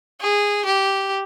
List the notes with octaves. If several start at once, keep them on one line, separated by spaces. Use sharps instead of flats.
G#4
G4